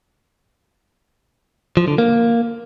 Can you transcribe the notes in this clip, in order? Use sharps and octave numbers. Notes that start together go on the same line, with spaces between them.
F3
D3
A#3